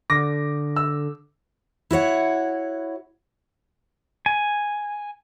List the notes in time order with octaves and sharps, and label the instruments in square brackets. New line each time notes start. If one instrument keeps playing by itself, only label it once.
[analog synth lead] D3 [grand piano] D6 A#6
[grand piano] E6
[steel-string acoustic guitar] E4 F#4 C#5 F#5
[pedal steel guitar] G#5